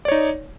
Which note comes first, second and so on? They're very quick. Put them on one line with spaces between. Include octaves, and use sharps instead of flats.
D5 C#5 D#4